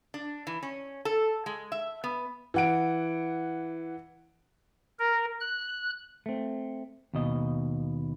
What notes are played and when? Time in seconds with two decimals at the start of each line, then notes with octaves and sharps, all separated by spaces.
0.14 D4
0.47 E3
0.63 C#4
1.05 A4
1.46 G#3
1.72 E5
2.04 B3
2.54 E3 F#5 D7
4.99 A#4
5.40 F#6
6.26 A3 C4
7.14 D#2 B2 D#5